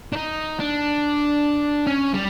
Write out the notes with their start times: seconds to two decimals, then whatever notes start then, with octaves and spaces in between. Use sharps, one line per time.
0.13 D4
0.16 D#4
0.60 D4
1.87 C#4
2.15 G3